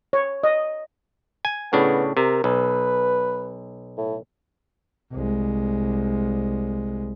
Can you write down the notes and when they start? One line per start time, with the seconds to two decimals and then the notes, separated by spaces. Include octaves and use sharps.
0.13 C#5
0.43 D#5
1.45 G#5
1.73 A2 C#3 B3 D4
2.17 C3 A#4
2.44 B1 B4
3.98 A2
5.12 C2 G#3